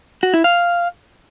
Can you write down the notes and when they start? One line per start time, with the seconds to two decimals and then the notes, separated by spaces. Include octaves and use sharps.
0.23 F#4
0.34 E4
0.44 F5